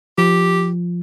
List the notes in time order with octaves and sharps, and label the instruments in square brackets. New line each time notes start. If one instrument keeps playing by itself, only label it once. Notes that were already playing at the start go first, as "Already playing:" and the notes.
[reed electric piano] F3 [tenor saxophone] G4